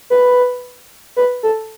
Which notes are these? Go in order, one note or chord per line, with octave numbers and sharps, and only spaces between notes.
B4
B4
A4